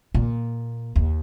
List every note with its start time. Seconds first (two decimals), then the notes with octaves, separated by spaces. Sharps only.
0.14 A#2
0.96 D#2